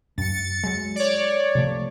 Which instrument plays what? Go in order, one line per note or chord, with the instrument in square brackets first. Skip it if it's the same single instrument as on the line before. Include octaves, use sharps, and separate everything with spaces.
[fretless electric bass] F#2 [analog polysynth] A6 C#7
[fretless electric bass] F#3 G#3
[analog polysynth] C#5 D5
[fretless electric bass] C3 F3 A3